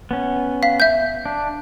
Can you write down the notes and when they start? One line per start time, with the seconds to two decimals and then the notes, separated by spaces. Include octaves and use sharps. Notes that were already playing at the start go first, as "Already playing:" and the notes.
0.11 B3 C#4
0.63 F5 B6
0.80 E5 G6
1.26 D4